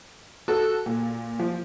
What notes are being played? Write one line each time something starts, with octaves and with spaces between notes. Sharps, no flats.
F#4 A4
A#2
F3